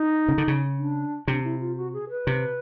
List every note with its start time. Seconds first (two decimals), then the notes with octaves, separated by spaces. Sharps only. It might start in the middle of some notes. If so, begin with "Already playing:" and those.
Already playing: D#4
0.28 C#3
0.38 D3
0.48 C#3
0.78 D4
1.28 C3 D4
1.44 E4
1.60 F4
1.77 F#4
1.93 G#4
2.10 B4
2.27 C3